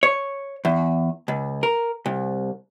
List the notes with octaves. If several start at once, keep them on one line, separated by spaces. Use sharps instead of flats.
C#5
E2
C#2
A#4
C2